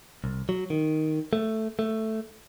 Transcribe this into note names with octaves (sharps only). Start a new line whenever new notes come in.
C2
F#3
D#3
A3
A3